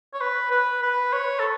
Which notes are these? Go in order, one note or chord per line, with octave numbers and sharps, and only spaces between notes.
C#5
B4
B4
B4
C#5
A4